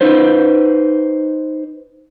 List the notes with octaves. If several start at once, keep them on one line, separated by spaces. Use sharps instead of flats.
D#4 B4 C5